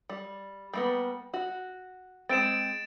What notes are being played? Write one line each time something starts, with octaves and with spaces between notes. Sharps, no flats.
G3
G3 A#3 B3
F#4
G#3 C4 A6 D7 E7